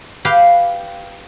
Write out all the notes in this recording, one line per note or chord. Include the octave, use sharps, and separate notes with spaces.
G4 B4 F5